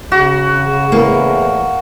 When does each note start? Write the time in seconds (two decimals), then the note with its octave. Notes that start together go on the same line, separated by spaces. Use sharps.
0.12 C#3 F#4
0.92 E2 A2 E3 A#3